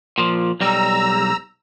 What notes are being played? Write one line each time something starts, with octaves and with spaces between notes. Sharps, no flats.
A#2 F3
B1 G3 A#5 E6